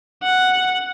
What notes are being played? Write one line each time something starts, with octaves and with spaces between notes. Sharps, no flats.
F#5